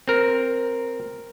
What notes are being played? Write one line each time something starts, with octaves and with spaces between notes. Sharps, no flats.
C4 A#4